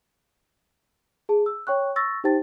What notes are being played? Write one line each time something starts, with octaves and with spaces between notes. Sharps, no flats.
G#4 A5
E6
C#5 G5 C#6 F#6
C#6 E6 A6 A#6
D#4 G4 C5 G5 A5 A6